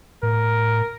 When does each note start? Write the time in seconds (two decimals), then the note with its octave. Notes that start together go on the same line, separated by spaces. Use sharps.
0.23 A2 A#4